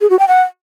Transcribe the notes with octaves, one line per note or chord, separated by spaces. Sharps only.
G#4
F#4
G5
F#5